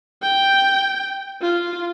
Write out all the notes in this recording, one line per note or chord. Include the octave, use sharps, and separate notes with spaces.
G5
F4